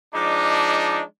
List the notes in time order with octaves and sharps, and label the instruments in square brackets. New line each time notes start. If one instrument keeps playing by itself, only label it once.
[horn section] F3 G#3 D4 [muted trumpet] D#4 [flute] D6